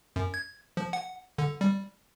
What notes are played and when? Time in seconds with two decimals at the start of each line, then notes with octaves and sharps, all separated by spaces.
0.16 F#2
0.34 G#6
0.77 F3
0.93 F#5
1.38 D3
1.61 G3